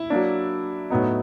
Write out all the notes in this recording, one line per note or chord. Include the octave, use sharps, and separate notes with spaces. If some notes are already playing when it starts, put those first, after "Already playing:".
Already playing: E4
F#3 A#3 D4
A2 F#3 B3 D#4